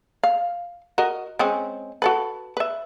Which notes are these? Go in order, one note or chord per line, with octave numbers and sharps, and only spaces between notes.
F5
F#4 A#4 D#5
G#3 C4 C#4
F#4 A4 B4
B4 E5